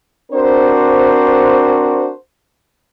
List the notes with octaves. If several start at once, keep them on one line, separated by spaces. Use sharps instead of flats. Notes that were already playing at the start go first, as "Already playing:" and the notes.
C4 D4 F#4 A#4 C5